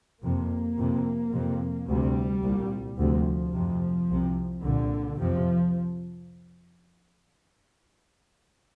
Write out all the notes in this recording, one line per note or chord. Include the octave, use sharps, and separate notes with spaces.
F2 C3 A#3
F2 C3
F2 C3
D2 C3 G3
C2 A#2
D2 C3 F3
F2 C3
C2 C3
C2 A#2 D3
F2 C3 F3